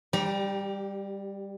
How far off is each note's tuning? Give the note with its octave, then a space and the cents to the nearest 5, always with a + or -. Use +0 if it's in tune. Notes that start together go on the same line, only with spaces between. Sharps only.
G3 +15 G4 -15 A#5 +30